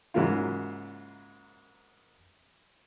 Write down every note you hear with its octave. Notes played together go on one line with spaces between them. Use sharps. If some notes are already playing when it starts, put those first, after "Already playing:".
G#2 C#3 F#3 A#3 E4 F4